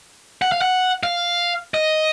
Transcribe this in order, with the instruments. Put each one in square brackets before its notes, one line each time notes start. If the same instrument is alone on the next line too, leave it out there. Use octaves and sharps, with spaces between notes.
[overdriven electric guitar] F#5
F5
F#5
F5
D#5